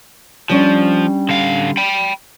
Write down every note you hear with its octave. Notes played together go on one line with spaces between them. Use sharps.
F3 G3 C#4 D4
D3 F5
G5 B5